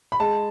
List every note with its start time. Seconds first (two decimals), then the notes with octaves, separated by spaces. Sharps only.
0.12 B5
0.20 G#3 A5